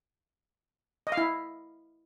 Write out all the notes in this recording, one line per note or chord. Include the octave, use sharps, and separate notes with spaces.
D#5
F5
E4